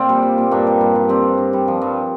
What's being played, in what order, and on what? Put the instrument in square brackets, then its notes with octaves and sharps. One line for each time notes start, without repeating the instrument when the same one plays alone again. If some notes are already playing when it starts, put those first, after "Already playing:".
Already playing: [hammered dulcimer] A#2 C4 F4 C5 D5 F5 G5
G3
G3
A#2
G2 A#3 D4
G3
G2
G3
G3 C4
G2
G2
G3
F3
G2